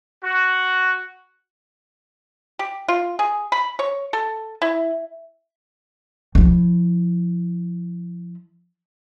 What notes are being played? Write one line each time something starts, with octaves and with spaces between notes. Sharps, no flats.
F#4
G4
F4
G#4
B5
C#5
A4
E4
F3 E4